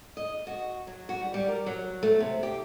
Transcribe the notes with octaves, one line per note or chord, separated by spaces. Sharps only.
D#5
F#4
F#3
F#4
G3
G3
A#4
F#3
A3
C3
G4